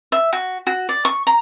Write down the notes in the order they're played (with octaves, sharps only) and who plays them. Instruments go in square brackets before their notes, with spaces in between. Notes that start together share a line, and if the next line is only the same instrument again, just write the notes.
[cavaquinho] E5
F#4
F#4
D5
C#6
A#5